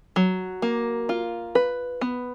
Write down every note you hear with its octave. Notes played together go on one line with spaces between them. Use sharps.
F#3
A#3
F4
B4
B3